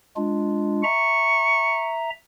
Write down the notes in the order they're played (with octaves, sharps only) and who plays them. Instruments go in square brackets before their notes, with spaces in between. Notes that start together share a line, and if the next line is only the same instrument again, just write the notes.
[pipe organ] G#3 D4 F4
[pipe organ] E5 A#5 [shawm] C#6